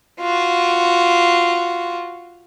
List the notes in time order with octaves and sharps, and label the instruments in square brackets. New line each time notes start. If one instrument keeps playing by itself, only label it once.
[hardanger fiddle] F4 F#4